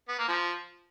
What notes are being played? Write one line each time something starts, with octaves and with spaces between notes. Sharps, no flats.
B3
A#3
F3